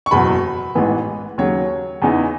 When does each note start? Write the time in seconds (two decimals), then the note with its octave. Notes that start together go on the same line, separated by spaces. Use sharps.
0.06 C#6
0.11 F#1 E2 B2 F#3 B5
0.75 A1 G#2 E3 B3
1.38 D#2 C#3 F#3 C#5
2.02 E2 C#3 E3 B3 D#4